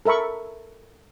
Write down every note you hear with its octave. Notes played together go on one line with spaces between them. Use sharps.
A4 A#4 E5 B5 C#6